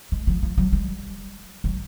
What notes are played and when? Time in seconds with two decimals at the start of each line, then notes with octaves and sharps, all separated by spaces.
0.12 G#3
0.27 F3
0.43 F3
0.58 F#3
0.73 G3
1.64 F#3